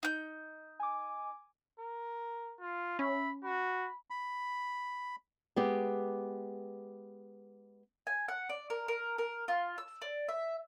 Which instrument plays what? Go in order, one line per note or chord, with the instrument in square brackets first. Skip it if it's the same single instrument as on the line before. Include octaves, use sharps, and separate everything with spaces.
[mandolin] D#4 G6
[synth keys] G#5 D6
[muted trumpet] A#4
[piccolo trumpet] F4
[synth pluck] C#4 [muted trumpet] E5 [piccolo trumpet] B5
[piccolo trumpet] F#4 [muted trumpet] B5
[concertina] B5
[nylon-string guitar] G#3 B3 G4
[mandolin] G#5
F#5
D5
A#4
A#4
A#4
F4
E6
D5
E5